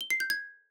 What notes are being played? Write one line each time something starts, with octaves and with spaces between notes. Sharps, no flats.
G7
C7
G6
G#6